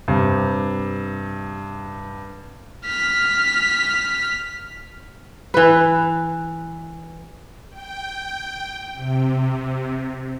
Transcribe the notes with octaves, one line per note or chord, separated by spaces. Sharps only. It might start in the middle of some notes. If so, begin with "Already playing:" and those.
G2 C3
F6 B6
E3 B4
G5
C3